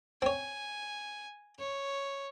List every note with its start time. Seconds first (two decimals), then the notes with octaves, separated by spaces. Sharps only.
0.22 C4 C#5 G#5
1.59 C#5